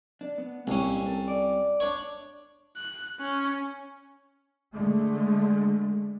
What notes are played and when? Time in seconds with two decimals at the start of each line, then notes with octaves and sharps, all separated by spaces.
0.21 D4
0.38 B3
0.67 C2 A#2 C4 C#4
1.06 A4
1.28 D5
1.80 D4 C#5
2.77 F#6
3.20 C#4
4.73 D3 G#3 A3